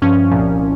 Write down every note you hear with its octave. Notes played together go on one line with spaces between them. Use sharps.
G2 F3 C#4
C2 A#2 F3